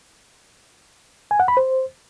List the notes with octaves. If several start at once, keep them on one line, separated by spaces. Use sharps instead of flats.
G#5
F#5
B5
C5